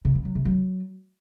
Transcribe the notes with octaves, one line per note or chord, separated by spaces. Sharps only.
C3
E3
F#3
C3
F#3